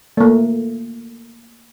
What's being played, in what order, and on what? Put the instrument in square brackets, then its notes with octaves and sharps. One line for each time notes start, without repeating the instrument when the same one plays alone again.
[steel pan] A3 A#3